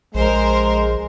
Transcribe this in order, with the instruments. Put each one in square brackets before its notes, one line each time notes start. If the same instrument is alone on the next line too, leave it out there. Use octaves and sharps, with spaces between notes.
[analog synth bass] A#1 [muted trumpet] G#3 [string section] A#4 C5